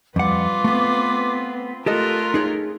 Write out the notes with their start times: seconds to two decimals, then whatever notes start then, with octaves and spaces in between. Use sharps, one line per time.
0.16 F2 G3 F4 B4 F#5 D6
0.64 A3 B3 C4
1.86 A3 F4 G4 A4 A#4 D#5 C6 F#6
2.34 D#4 G#4 C#5